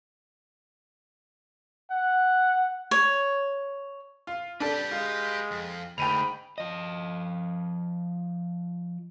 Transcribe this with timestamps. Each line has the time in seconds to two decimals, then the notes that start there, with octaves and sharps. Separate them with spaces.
1.91 F#5
2.91 C#5
4.27 F4
4.60 D4 G4 A4 B4
4.91 G#3 F4
5.51 F2
5.98 D2 G#2 G5 B5 D#7 F7
6.58 F3 D#5